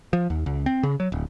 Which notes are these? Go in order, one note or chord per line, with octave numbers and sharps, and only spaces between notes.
F3
D#2
C#2
C4
C#3
F#3
D1